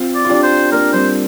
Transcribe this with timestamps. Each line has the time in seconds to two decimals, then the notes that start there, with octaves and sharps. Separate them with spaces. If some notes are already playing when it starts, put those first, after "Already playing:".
Already playing: C4 F4
0.15 D5
0.25 F4
0.29 D4 G4 D5
0.43 C5
0.72 A#3 D4 A#4
0.93 G3 C4 C5